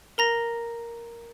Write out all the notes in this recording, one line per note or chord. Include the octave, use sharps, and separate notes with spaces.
A#4 A#5 A#6